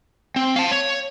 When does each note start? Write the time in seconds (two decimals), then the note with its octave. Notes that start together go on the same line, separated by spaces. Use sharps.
0.36 C4
0.56 F5 A5
0.71 C#5